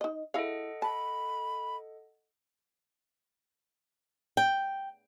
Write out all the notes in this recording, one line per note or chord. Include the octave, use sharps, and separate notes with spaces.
D#4 D#5
E4 G#4 A4 D#5 F5 F#5
A5 B5
G5